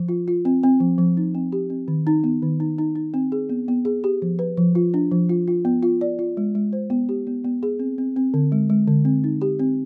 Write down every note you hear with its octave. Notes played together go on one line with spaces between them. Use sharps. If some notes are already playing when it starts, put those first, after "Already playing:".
Already playing: F3
F4
F4
C4
C4
F3
F3
D#4
C4
G4
C4
D#3
D#4
B3
D#3
D#4
D#4
D#4
C4
G#4
B3
B3
G#4
G4
F3
B4
F3
F4
D4
F3
F4
F4
B3
F4
D5
F4
G#3
G#3
C5
B3
G4
B3
B3
G#4
C4
C4
C4
D3
G#3
G#3
D3
C4
D#4
G4
C4